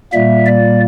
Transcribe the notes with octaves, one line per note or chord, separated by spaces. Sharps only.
A#2 G3 A#3 E5
D5